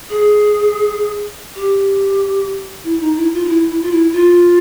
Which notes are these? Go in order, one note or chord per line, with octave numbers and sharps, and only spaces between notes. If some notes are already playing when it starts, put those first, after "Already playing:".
G#4
G4
E4
D#4
E4
F4
D#4
E4
E4
F4
E4
F4